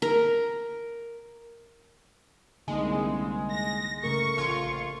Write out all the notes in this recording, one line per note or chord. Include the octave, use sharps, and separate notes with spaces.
A#4
C2 D3 G#3 A#3 D#4
A#6
C#3 A3 A#4 C#6
A#1 F4 G#6